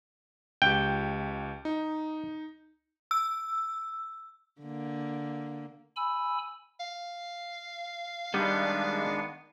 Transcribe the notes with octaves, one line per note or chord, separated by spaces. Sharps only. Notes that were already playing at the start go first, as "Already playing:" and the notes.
C#2 G4 G5
D#4
E6
D3 A#3
G#5 B5 E6
F5
D#3 G3 G#3 B3 D4